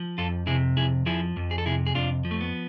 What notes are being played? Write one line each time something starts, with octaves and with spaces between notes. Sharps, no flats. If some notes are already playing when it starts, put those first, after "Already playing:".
Already playing: F3
F2 F4 A4
C3 E4 G#4
F2 E4 G#4
F3 E4 G#4
F2
G#4
A4
C3 E4 G#4
G#4
F2 D4 F4
F3
A3
B3